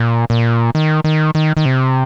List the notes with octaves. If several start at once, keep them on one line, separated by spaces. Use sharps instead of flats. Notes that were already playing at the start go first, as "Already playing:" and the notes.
Already playing: A#2
A#2
D#3
D#3
D#3
D#3
C3